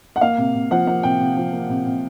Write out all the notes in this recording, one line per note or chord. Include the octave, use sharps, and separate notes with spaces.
F#5
A#3 F5
C3
C3
F3 F#5
A#3 F#5
C3 G5
C3
F3
A#3
C3
C3